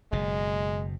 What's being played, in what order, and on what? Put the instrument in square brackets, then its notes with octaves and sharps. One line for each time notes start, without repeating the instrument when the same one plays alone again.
[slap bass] F#1 B2 [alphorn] G#3